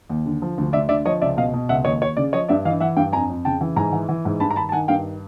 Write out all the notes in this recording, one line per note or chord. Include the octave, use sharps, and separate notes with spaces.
D#2
D3
F3
D2
D2 D5 E5
D3 D5 E5
F3 C#5 D#5
C#2 D5 E5
B2 D#5 F5
B2
C#2 E5 F#5
D#2 C#5 D#5
D#2 C#5
C#3 D5
F3 C#5 D#5
G2 D5 E5
E3 D#5 F5
E3 E5 F#5
G2 F5 G5
F2 G#5 A#5
F2
C#3 G5 A5
E3
G#2 G#5 A#5
E3
E3
G#2
G2 A5 B5
A#5
D#3 A5 B5
A5
D#3 F#5 G#5
G2 F5 G5